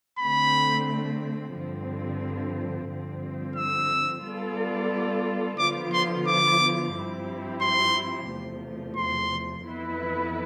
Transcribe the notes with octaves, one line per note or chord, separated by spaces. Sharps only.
D3 A3 C4 B5
G2 D3 F3 C4
G2 D3 F3 C4
E6
G3 B3 F4 A4 D5
D3 F3 B3 F4 D6
C6
D6
G2 F3 C4 E4 G4
C6
E2 C3 F3 A3
C6
F2 E3 B3 E4 B4